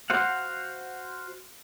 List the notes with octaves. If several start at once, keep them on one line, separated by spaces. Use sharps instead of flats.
F#4 C5 F5 F#5